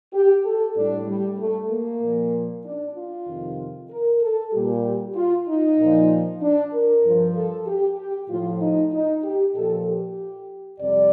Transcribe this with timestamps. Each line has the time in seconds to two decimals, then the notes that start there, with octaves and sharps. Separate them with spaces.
0.14 G4
0.45 A4
0.76 A2 G3 D4
1.08 G3
1.39 A3
1.70 A#3
2.02 A#2 F3
2.65 D4
2.96 F4
3.27 F2 C3 D#3
3.90 A#4
4.21 A4
4.53 A#2 G3 G4
5.16 F4
5.48 D#4
5.78 A#2 F3
6.42 D4
6.73 A#4
7.04 G2 F3
7.36 A4
7.67 G4
7.98 G4
8.30 A2 F3 F4
8.61 D#4
8.92 D#4
9.24 G4
9.55 A#2 F3 A4
9.87 G4
10.80 F2 C3 G3 D5